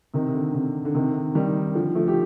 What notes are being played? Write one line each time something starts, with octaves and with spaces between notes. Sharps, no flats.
C3 D#3
C3
D3
C3
D3
C3 D#3
D#3 G3
D3 F3
F3 A3
G4